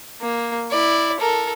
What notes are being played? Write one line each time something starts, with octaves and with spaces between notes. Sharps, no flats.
A#3
E4 D5
A4 A#4